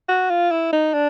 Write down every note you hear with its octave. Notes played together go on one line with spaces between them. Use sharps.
F#4
F4
E4
D#4
D4